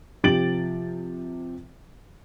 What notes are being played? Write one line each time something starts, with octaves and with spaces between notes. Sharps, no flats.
C3 F3 G4 A6 D7 F#7